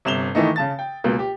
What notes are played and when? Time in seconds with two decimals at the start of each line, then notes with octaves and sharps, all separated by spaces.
0.05 G1 C3 E7 F7 G7
0.35 D#3 E3 A3 D#4
0.56 C#3 A5 A6
0.79 G5
1.04 C#2 B2 A#3
1.19 G4